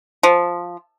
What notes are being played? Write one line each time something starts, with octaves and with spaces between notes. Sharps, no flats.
F3